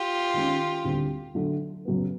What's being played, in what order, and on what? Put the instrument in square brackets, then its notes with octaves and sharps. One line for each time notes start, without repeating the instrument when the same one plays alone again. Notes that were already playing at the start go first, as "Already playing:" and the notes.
Already playing: [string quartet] F4 G4
[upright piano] D#3 G#3 C#4
D2 D3 G3 C4
D3 F#3 A3
F#2 C#3 F#3 B3